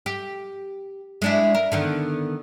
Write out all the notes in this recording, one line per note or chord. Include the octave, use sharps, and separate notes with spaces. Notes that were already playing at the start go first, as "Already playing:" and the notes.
G4
G#3 D4 E4
A#4
D3 D#3 B3